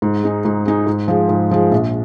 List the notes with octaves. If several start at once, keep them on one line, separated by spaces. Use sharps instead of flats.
G#2
G#3 D#4 G#4
G#2
G#3 D#4 G#4
G#2
F3 G#3
G#2
F3 G#3
A#1